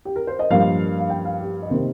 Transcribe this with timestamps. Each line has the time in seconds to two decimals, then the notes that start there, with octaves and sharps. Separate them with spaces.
0.05 G4
0.16 A#4
0.27 C5
0.39 D#5
0.50 G2 F3 A#3 F5
0.98 F5
1.10 G5
1.25 F5
1.41 G4
1.62 D#5
1.70 C3 D#3 A#3 C5